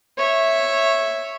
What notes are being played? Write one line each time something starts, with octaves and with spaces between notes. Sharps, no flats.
C#5 E5